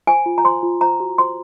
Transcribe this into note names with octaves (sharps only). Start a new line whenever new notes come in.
C5 G#5
F4
A#5
C5 C6
F4
C5 A#5
F#4
C5 C6